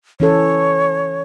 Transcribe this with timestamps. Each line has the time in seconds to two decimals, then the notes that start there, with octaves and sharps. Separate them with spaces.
0.20 E3 C#4 A4 C#5